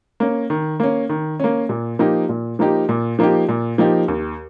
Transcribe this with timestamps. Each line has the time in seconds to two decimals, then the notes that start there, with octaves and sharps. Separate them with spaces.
0.20 A#3 C#4
0.50 D#3
0.80 A#3 C#4
1.09 D#3
1.40 A#3 C#4
1.69 A#2
1.99 F3 A#3 D#4 G4
2.29 A#2
2.59 F3 A#3 D#4 G4
2.89 A#2
3.19 F3 A#3 D#4 G4
3.49 A#2
3.78 F3 A#3 D#4 G4
4.08 D#2